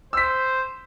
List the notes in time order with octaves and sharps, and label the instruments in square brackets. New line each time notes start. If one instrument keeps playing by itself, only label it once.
[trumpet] C5 [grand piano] E6 B6